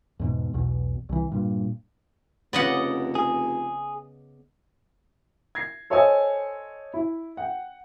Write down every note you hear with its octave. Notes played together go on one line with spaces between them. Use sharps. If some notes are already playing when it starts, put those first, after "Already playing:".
E2 G#2 B2
B1 E2 B2
C2 E3
G2 A#2
F1 C#3 B3 D5 D#5 F#5
G#4
G#6 A#6 C7
A4 C5 C#5 D#5 G#5 E6
E4
F#5 G5